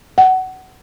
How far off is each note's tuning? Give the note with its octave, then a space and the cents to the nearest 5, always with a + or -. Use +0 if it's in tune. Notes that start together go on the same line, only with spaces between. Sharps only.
F#5 +20